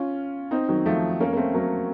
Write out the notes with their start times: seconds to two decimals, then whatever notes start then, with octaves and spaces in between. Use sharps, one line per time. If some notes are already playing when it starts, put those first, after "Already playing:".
Already playing: C#4 F4
0.51 C4 D#4
0.68 D#3 F#3
0.86 F3 A3
1.20 A#3 C#4
1.33 A#3
1.36 A3 C4
1.54 F#3 A#3